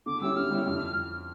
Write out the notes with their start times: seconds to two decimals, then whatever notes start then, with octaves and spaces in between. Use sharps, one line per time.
0.06 D3 D6
0.21 G3 C#4 E4 G4 E6
0.36 D3 F6
0.51 G3 C#4 E4 G4
0.66 F2